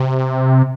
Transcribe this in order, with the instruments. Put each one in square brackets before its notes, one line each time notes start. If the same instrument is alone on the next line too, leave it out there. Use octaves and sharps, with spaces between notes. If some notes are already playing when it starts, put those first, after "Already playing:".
Already playing: [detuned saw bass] C3